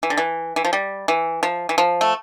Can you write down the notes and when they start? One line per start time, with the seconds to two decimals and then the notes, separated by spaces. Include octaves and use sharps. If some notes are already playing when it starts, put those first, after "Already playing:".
0.03 E3
0.10 D3
0.17 E3
0.56 E3
0.65 F3
0.73 G3
1.08 E3
1.43 F3
1.69 E3
1.78 F3
2.01 A3